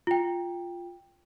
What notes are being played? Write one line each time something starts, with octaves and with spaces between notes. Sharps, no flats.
F4 G5